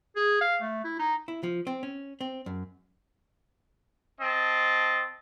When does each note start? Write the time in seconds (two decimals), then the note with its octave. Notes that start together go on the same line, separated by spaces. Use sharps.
0.16 G#4
0.41 F5
0.62 A3
0.84 E4
0.99 D#4
1.28 E4
1.43 F3
1.67 C4
1.83 C#4
2.21 C4
2.46 F#2
4.21 C4 D#5 A5